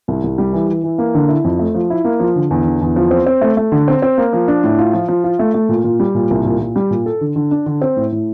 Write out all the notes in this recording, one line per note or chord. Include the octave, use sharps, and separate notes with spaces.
C2
C2
G3
E3
E3
E3
A#3
D3
E4
F2
A3
F3
E4
A#3
F3
D3
E2
D3
E2
F3
C4
C4
A3
A3
D3
C4
C4
A#3
F3
D4
A2
F4
F3
F3
F4
A3
A3
A#2
A#2
G3
A#2
C2
A#2
A#2
G3
A#2
A4
D3
D3
D4
D3
C4
A2
A2